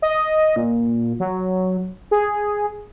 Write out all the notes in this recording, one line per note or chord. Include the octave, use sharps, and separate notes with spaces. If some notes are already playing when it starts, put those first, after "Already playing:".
D#5
A#2
F#3
G#4